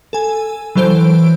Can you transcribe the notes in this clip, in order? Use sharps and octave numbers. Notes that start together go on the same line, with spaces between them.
A4 G#5
E3 F#3 A4 C5 G6 D7